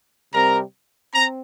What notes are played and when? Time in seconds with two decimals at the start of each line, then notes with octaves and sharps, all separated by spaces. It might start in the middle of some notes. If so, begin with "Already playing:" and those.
0.33 C3 G3 C4 A#4 A#5
1.13 C4 A#5